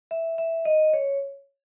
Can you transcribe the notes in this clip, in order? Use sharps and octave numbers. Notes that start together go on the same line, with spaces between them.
E5
E5
D#5
C#5